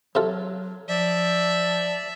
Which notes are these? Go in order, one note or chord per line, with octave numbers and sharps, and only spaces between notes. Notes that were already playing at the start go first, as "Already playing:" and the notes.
C3 F#3 F4 A4
F3 D5 E5